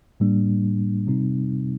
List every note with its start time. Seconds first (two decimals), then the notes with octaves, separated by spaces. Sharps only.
0.20 A2 G3 A#3 D4
1.07 C3 G3 C4 D#4